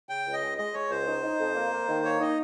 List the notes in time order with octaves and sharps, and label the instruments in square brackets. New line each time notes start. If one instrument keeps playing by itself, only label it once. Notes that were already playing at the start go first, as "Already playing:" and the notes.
[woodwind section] C#3 [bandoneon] G5
[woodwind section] C#2
[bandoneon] D#5
[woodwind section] G#3
[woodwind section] G#3 [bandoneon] D#5
[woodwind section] G#3 [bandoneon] C#5
[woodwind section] C#2 [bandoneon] C5
[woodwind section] D#4
D#4
F2
A#3
A#3
D#3
[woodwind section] A#3 [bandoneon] C#5
[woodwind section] D#4 [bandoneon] D#5